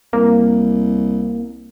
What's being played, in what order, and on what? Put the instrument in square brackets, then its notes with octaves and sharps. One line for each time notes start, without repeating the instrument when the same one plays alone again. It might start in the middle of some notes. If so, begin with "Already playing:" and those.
[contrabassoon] C2 [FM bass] A#3